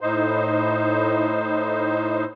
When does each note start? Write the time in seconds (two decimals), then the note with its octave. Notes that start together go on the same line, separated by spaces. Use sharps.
0.01 A2 D#4 C5